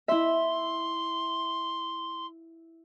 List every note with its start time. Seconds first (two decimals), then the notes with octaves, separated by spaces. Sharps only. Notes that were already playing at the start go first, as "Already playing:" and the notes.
0.08 E4 E5 C6